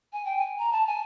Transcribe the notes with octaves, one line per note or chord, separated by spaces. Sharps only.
G#5
G5
G#5
A#5
A5
G#5